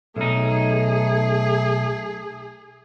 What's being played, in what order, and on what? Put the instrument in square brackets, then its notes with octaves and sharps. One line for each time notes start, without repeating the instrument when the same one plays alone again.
[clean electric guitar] B1 D#4 [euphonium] A3 [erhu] G#4